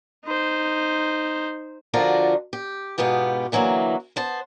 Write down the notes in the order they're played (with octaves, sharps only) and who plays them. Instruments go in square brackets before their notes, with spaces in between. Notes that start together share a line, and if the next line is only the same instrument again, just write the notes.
[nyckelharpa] D#4 C5
[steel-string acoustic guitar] D3 F3 F4 F#4 A#4 D5
G4
G#2 B2 B3 F4 G4
D3 E3 F#3 A3 A#3
B3 C5 A5